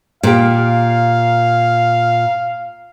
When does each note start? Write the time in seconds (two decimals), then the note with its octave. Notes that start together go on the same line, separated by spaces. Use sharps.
0.23 A#2 G4 F5